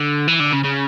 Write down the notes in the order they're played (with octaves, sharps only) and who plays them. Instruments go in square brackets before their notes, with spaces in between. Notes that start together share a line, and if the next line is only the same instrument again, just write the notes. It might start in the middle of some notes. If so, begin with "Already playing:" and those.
Already playing: [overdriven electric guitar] D3
E3
D3
C#3
C#3